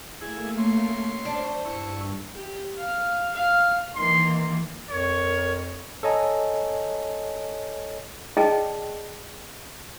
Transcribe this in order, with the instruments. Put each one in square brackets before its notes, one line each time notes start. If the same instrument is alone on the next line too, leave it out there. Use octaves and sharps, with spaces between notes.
[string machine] A3 A#3 [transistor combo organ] E4 G#4
[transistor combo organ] C#4 C6
[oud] D4 [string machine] C5
[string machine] G2 [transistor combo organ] E4 C#6
[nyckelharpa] G4
F5
F5
[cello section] D#3 E3 A#3 [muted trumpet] C6
[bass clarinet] F2 [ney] A#4 [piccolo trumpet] C#5
[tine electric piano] A4 C#5 D#5 G#5 A#5
[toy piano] G#4 D5 D#5 G5 A5 A#5